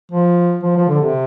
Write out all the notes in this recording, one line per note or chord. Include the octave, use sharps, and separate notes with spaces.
F3
F3
F3
D3
C3